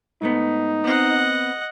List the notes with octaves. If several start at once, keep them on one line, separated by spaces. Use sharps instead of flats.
G#2 A3 B3 D#4
B3 C4 D#5 F#5